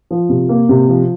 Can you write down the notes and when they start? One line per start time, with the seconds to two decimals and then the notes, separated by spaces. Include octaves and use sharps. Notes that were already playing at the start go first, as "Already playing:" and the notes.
0.11 F3
0.29 C3
0.49 A#3
0.69 C3
0.88 F3